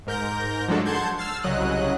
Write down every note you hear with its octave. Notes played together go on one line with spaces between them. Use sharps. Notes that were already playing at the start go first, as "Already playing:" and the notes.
G#2 A#4 G6 A#6
F3 F#3 G#3 D4 A4
F#5 A5 C6 G6 G#6
E6 F6 A6 C7
C2 C#3 F#3 D#5 F#6